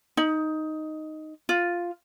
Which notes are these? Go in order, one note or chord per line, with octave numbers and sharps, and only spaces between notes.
D#4
F4